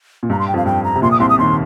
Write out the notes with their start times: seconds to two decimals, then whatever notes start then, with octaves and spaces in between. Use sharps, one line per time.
0.23 A#2
0.30 G2 A#5
0.39 C6
0.48 G5
0.54 F2 F5
0.66 G2 G5
0.84 A#5
0.95 C3
1.02 A#1 A#2 C6
1.11 D#6
1.20 C2 C3 C6
1.29 D#6
1.38 D#2 D#3 C6